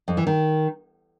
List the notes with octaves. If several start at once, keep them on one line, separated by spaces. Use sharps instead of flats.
F2
E3
D#3